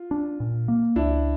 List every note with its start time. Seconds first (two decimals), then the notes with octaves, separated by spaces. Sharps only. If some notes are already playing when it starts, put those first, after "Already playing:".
Already playing: F4
0.11 D4
0.40 A#2
0.68 A#3
0.96 C#2 D4 E4